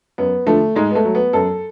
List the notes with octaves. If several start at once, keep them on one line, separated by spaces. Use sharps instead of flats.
F#2 B3
D3 F3 A3
G#2 G#3
B3
A3
F#3
B3
F#2 A4